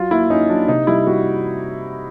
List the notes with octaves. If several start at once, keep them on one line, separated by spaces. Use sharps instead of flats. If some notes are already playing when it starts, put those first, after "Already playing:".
Already playing: F#3 F4
A#3 E4
C#4 D#4
F#3 D4
C3 D#4
G3 E4
G3 F#4